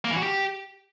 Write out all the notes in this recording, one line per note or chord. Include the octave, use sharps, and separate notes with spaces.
A#3
E3
F#4
G4